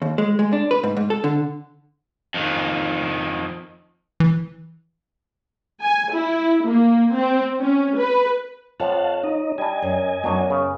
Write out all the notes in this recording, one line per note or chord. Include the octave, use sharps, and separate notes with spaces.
D#2
G#3
G#3
D4
B4
G#2
G#2
A4
D3
F2 D#3
E3
G#5
E4
A#3
C4
C#4
B4
F2 F3 C#5 F5 F#5 A5
D#4 D#5
G3 D4 D#5 G#5
F#2
F#2 F#3 B3 D4 D#4
C#3